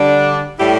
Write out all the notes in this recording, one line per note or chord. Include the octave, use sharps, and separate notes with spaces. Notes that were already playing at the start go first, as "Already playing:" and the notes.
Already playing: D3 G3 D4
A2 G3 E4 G4